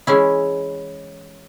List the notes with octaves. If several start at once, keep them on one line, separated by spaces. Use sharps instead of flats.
E3 G#3 C#4 E4